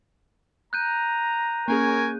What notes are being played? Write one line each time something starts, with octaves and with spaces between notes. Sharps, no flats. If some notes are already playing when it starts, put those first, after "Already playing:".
A#5 F#6 G6 D#7
A#3 C#4 G#4 A#4 C#5 G#5